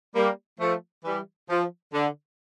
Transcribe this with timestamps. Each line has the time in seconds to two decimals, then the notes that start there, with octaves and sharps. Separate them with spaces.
0.15 G3 A#3
0.60 F3 A3
1.04 E3 G3
1.50 F3
1.93 D3